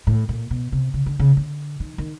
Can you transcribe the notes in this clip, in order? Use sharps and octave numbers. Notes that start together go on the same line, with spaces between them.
A2
A#2
B2
C3
C#3
D3
C#3
D3
D#3
D#3